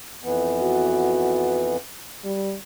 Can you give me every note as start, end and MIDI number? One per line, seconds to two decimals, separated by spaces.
0.24 1.77 41
0.24 1.77 52
0.24 1.77 59
0.63 1.71 66
2.24 2.55 55